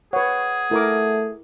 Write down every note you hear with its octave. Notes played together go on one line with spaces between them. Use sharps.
G#4 B4 C#5 F#5
A3 E4 A#4 D6